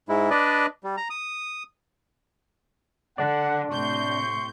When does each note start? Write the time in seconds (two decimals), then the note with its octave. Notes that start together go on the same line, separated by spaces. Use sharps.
0.09 G#2 G#3 E4
0.30 D4 B4 D5 D#5
0.84 G3
0.97 A#5
1.10 D#6
3.18 D3 D4 D5 F#5
3.71 A2 C3 C6 C#6 G6